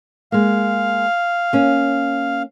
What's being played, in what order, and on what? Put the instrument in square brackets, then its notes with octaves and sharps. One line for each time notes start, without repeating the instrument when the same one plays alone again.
[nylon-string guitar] G#3 A#3 [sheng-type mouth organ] F5
[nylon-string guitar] A#3 C#4